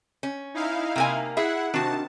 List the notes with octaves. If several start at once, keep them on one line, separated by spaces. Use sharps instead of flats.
C#4
D#4 E4 F5
C3 A#3 G#5
E4 G#4 E5 F#5
C3 D#3 D4 F#4 A5